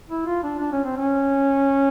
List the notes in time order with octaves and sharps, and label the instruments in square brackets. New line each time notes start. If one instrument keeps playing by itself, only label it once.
[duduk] E4
F4
D4
D4
C#4
C4
C#4